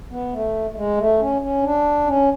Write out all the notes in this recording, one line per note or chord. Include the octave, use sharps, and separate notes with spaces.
B3
A3
A3
G#3
A3
C#4
C#4
D4
C#4